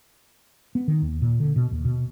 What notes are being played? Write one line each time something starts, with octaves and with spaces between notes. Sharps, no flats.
B3
D#3
D#2
A#2
D3
B2
D#2
B2